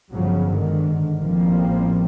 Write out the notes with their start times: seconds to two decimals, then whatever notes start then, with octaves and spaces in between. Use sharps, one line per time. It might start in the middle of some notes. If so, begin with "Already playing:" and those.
0.12 G1 G2 C#3 F3 F#3
0.47 G#2 D3 D#3
1.19 A1 F3 G3 A#3 C4